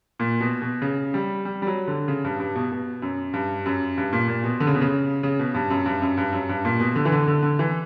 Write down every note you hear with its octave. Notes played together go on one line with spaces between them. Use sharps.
A#2
B2
B2
C#3
G3
G3
G3
F#3
D3
C#3
G2
G2
B2
B2
F#2
G2
F#2
G2
A#2
A#2
B2
D3
C#3
B2
C#3
C#3
B2
G2
F#2
G2
F#2
G2
F#2
G2
A#2
B2
D3
E3
D3
D3
D3
E3